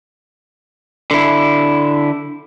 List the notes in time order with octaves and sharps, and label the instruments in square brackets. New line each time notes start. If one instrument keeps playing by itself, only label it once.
[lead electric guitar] D3 E4